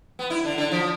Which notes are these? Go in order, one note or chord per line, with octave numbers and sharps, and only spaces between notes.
B3
E4
D3
D3
F3